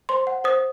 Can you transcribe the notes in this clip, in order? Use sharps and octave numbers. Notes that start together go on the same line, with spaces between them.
C5 C6
F#5
C5 D#6